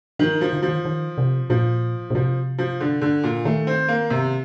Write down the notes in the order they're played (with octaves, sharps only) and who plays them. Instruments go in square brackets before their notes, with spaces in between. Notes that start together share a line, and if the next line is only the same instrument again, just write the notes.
[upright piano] D#3 [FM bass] F3
[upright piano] F3
[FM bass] D3
[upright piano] F3
[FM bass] D#3
D#3
C3
[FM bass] A#2 [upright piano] F3
[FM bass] A#2
[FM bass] C3 [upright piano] F3
[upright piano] F3
D3
D3
A#2
[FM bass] D#3 [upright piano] A3
[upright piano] C4
A#3
C3